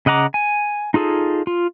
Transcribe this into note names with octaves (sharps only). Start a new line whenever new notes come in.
C#3 D#5 F#5 A#5 D6
G#5
D#4 F4 G#4 A4
F4